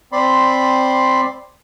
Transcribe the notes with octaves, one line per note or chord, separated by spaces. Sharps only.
C4 D5 B5 C6